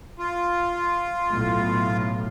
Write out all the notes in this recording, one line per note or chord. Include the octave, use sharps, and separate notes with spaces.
F4
B1 A2